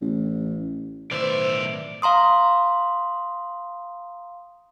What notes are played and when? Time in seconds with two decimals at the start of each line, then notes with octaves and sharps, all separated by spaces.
0.01 A1
1.11 B1 A2 D#3 B4 C5 D5 E5
2.02 F5 A#5 C6 D#6